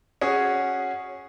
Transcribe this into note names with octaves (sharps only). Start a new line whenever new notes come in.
C#4 F#4 G#4